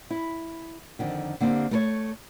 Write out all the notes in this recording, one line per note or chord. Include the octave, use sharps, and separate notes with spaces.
E4
F2 D3 D#3
D3 A#3 C4 G4
A3 A#4 C#5